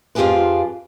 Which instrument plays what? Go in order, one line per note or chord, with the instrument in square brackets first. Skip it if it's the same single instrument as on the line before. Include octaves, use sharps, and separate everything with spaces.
[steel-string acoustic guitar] F2 F3 F4 G4 G#4 B4